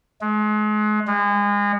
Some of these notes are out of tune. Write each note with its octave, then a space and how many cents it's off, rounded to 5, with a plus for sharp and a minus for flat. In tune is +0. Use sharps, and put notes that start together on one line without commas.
G#3 +35
G#3 -30